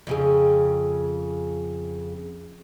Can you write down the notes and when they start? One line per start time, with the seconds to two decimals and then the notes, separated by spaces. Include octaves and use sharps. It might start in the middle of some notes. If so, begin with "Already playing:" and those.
0.07 F2 C#3 G#4